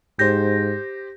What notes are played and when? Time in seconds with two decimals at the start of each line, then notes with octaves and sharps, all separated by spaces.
0.19 G#2 G4 C5 G6 A#6